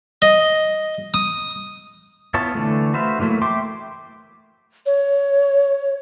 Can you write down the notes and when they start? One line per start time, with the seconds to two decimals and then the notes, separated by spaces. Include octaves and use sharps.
0.22 D#5
1.14 D#6
2.34 B3 E4 F4 C#5 A5
2.55 D3 E3 A3
2.94 F#4 B4 C5 E5 F5
3.19 D3 E3 F#3 A3 A#3
3.42 E5 G5 C6 D6
4.86 C#5